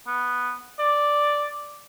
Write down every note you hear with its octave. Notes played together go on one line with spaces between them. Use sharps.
B3
D5